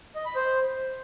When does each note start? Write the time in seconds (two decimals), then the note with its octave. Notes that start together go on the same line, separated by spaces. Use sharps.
0.15 D#5
0.26 B5
0.36 C5